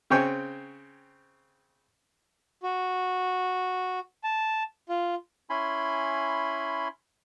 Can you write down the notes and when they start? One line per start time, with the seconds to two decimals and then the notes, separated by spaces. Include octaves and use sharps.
0.10 C#3 C4 C5 C#5 G5 G#5
2.63 F#4
4.24 A5
4.89 F4
5.50 C#4 E4 G#5 B5 C6